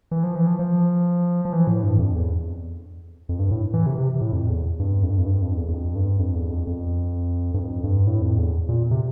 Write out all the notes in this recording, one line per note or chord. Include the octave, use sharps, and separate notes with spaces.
E3
F3
E3
F3
F3
F3
E3
A2
G2
F2
E2
F2
G2
A2
E3
C3
C3
A2
F2
E2
G2
F2
G2
F2
G2
F2
E2
E2
F2
G2
F2
E2
F2
F2
G2
F2
G2
A2
F2
E2
A#2
C3